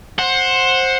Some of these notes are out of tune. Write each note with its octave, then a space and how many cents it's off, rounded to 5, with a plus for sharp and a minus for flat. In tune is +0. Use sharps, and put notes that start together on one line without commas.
C5 +15 F#5 -10